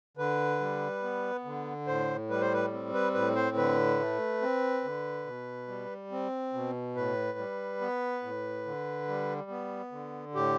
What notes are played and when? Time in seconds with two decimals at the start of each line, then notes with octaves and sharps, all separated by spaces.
0.17 D3 B4
0.60 G3
1.03 B3
1.45 D3
1.87 A2 C5
2.30 G3 B4
2.41 C5
2.53 B4
2.73 C4
2.94 B4
3.14 A2 B4
3.35 C5
3.57 D3 B4
4.00 A3
4.42 C4
4.84 D3
5.26 B2
5.68 G3
6.12 C4
6.53 B2
6.95 A2 B4
7.38 G3
7.81 B3
8.23 A2
8.66 D3
9.08 G3
9.50 B3
9.92 D3
10.35 A2 G4